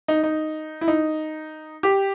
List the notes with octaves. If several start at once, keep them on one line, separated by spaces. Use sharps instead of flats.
D#4
D#4
E4
D#4
G4